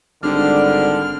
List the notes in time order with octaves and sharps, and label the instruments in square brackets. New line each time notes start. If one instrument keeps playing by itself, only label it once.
[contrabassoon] G#1 [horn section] D3 G3 [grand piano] D4 [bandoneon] F6